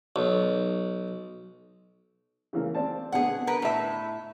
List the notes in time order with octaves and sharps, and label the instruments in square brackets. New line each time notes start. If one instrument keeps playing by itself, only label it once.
[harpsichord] B1
[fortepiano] C#3 E3 A#3
C4 D5 A5
[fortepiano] B2 D3 B3 [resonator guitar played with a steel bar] G#4 F#5
[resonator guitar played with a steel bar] A#4 B4
A2 E5